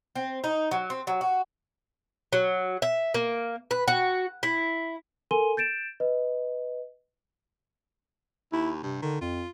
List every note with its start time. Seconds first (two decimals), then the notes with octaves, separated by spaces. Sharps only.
0.16 C4
0.44 D#4
0.71 F#3
0.90 C4
1.07 F#3
1.21 F#4
2.33 F#3
2.82 E5
3.14 A#3
3.71 B4
3.88 F#4
4.43 E4
5.31 A4 A#4 G#5 C6 D#7 G7
5.57 G6 A6 D7 E7
6.00 B4 D#5
8.52 D#2 E4
8.83 G2 C3
9.02 D3 D#3
9.21 F2 F4